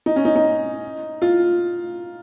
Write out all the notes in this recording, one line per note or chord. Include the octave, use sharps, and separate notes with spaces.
D#4
C#4
D#4
D#4
F4